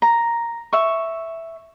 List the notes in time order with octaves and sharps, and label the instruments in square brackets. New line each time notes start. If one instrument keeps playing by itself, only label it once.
[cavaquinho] A#5
E5 C#6